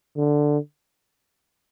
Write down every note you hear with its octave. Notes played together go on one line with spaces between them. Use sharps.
D3